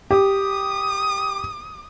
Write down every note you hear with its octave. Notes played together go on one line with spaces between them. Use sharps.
G4 D#6